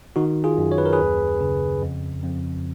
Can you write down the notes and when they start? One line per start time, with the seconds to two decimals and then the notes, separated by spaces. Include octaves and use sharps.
0.16 D#3 D#4 F#4
0.44 F4 G#4
0.58 F#2
0.72 C#5
0.78 B4
0.86 A#4
0.93 G#4 B4
0.99 D#2
1.41 C#3
1.82 F2
2.23 F2